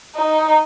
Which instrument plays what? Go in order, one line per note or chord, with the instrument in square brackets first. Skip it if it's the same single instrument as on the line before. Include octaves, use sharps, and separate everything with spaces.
[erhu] D#4